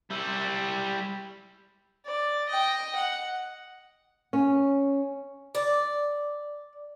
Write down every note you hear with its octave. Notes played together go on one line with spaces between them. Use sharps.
G3 E4
D5
D#5 G5
F#5
C#4
D5